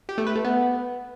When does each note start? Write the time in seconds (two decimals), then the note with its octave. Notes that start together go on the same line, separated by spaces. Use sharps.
0.09 G4
0.18 A3
0.27 B4
0.36 A3
0.44 B3